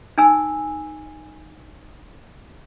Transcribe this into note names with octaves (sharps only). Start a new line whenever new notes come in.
D#4 G#5 E6